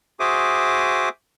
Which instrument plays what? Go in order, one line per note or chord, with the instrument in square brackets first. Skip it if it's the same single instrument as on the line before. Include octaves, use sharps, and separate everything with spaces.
[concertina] F#4 G#4 C5 E5 D6 D#6